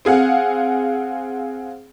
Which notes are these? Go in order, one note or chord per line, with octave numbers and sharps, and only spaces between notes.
C4 G#4 F5 F#5